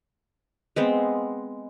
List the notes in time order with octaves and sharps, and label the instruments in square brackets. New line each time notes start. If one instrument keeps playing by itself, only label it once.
[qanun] G#3 B3 C4